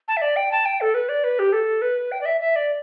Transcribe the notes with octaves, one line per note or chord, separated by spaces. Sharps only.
A5
E5
D5
G5
A5
G5
A4
B4
D5
B4
G4
A4
B4
G5
D5
E5
E5
D5